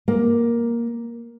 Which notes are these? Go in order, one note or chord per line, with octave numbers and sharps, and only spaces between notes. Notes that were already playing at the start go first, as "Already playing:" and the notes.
A#3